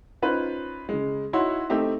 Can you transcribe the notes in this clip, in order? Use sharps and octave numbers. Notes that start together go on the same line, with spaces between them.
C#4 D#4 F4 B4 C5
C#3 G#3
D#4 E4 F#4 C#5 C6
A3 C4 D#4 G4 E5